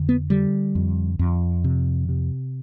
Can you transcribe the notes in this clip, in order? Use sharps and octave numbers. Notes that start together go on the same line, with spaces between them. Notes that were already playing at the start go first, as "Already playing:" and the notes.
Already playing: F2 D3
B3
D3 G3
F2
F2
C3
C3